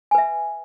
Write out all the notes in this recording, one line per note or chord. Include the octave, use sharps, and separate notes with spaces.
B4 E5 G#5